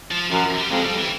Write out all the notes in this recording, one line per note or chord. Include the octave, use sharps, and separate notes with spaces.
F3
F#2 F3
G3
F2 G#3
G3
E3